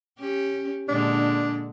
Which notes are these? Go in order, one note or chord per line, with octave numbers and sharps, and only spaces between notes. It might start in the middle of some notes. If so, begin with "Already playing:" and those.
C#4 G4
A#2 D3 G#3 D4